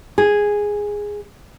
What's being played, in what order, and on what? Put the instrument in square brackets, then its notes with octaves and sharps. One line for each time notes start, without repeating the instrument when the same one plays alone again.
[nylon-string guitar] G#4